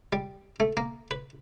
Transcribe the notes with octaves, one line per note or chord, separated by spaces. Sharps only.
G3
A3
A#3
B4